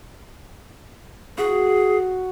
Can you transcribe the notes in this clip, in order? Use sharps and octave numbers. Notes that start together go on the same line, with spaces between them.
F#4 G#4